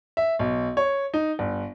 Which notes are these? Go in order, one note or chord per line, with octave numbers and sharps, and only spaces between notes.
E5
B1
C#5
D#4
G1